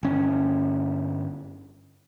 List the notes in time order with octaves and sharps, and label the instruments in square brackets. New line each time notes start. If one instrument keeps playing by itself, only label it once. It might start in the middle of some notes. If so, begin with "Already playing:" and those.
[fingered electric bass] G1 C#4